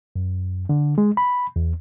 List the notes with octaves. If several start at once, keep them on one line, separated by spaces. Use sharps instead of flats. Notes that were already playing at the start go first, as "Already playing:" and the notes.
F#2
D3
G#3
B5
E2